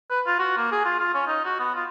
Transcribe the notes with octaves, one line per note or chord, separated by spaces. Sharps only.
B4
F4
F#4
A#3
G#4
F4
F4
C#4
D#4
F#4
B3
F4